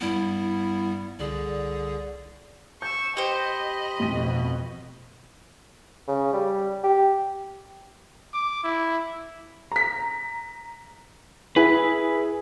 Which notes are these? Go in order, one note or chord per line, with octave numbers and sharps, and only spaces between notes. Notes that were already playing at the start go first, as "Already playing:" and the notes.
G2 G3 B3 E4
C2 D3 G#4 D5
C#6 E6 G6
G4 C5 D#5 B5
A1 F2 B2 D#7
C#3
G3
G4
D6
E4
A#5 B6
E4 G#4 B4